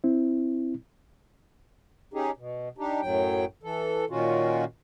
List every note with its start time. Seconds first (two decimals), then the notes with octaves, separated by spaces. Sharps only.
0.04 C4 E4
2.14 C#4 D#4 G4 G#4
2.37 B2
2.78 D4 D#4 G4
3.01 F#2 A2 F#3 G5
3.63 E3 A4
4.10 A#2 D#3 C#4 F4 F#4